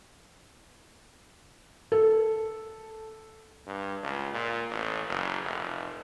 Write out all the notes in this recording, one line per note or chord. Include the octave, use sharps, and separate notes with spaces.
A4
G2
C#2
A#2
A1
F#1
F1